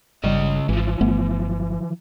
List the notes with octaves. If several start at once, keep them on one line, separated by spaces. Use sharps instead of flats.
G1 C#3 G3 D#5
G#1 E3 F3
G1 A3 B3